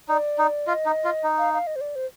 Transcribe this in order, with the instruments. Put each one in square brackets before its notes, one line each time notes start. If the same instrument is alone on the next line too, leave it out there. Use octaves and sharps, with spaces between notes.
[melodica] D#4 [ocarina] D5
[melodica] D#4
[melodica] F4 [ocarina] D#5
[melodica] D#4
F4
D#4
[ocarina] F5
F5
D#5
C5
D5
C5